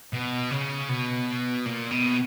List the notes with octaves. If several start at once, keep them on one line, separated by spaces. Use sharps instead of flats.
B2
C#3
B2
A#2
B2